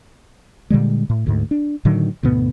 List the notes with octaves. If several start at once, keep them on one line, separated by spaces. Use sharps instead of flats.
A#2 D3 G3 G#3
A2
D2 G#2
D4
A2 D3 D#3 F#3
D2 G#2 B2 B3